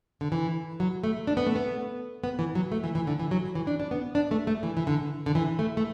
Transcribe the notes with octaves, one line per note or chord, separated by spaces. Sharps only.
D3
E3
F#3
A3
D4
B3
A3
B3
B3
E3
F#3
A3
E3
E3
D3
E3
F#3
E3
D4
D4
B3
D4
A3
A3
E3
E3
D3
D3
E3
A3
A3